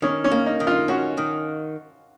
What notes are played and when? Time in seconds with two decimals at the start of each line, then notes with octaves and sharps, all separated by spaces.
0.02 D#3 C#4
0.24 C#4
0.32 A#3
0.46 D#4
0.60 D#3
0.67 F4
0.88 C#4 F#4
1.18 D#3